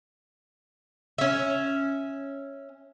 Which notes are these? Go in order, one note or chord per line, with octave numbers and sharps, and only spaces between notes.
C#4 E5